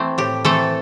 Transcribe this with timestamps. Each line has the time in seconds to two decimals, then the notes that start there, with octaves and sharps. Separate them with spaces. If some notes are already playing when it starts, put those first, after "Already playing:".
Already playing: E3 A3 C4 E4
0.18 A2 G4
0.45 E3 A3 C4 A4